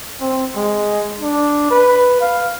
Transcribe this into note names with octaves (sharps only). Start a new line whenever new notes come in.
C4
G#3
D4
B4
F5